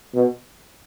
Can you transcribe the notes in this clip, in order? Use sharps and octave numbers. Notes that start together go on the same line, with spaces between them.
B2